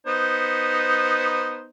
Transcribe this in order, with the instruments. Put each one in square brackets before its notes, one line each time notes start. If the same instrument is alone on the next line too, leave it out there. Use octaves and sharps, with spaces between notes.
[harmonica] B3 D#4 C5